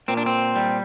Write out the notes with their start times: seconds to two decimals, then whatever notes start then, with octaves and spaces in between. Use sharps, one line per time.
0.08 A#2 C4
0.17 D4
0.26 C4
0.56 G3